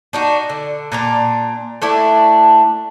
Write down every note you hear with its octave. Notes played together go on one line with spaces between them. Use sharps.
D4 D#4 F#4
D3
A#2 D4 A#5
A3 D4 E4 E5